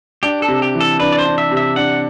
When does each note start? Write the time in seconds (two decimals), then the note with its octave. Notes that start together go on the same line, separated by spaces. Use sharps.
0.23 D4 G4
0.42 A4
0.48 C3
0.62 G4
0.75 E3
0.81 A4
1.00 D4 B4
1.12 D5
1.18 C5
1.25 D4
1.38 E5
1.51 C3
1.57 E5
1.76 D4 F#5